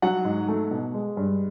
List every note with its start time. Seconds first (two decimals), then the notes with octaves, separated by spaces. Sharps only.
0.02 F#3 F#5
0.25 G#2
0.48 A3
0.71 B2
0.94 G#3
1.17 G2